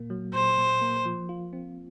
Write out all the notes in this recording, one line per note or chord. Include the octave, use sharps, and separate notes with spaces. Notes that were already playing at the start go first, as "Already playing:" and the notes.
Already playing: A#2 A#3
F#3
A#2 C5
A#2
A#3
F3
F4
C4